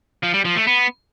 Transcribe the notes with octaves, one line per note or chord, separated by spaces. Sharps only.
F3
G3
F3
A3
B3